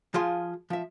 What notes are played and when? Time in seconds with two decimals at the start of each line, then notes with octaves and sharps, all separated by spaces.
0.14 F3 F4 G#4 C6
0.70 F3 E5